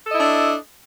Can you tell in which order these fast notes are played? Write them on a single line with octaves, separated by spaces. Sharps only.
A4 D#5 E4 D4